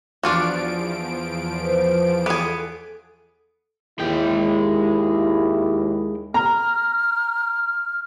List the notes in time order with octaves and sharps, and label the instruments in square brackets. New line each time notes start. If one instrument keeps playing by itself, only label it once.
[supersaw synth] E2 F3 D7 [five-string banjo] D4 F4 F#4
[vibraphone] B4 C5
[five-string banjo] B3 G#4 [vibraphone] A4
[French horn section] D#2 E4 [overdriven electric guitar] G#3 G5
[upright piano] A#5 [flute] F6